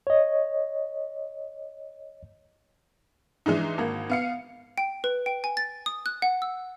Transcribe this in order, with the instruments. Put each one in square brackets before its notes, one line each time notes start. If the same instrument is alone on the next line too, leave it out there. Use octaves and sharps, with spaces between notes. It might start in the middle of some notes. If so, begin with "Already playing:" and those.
[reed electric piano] C#5 D#5
[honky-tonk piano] E3 G#3 D4 D#4
G#1 A#3
B3 F5 C#7
[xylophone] G5
B4
G5
G#5
A6
D#6
F#6
F#5
E6